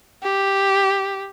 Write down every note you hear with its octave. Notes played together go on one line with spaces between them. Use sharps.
G4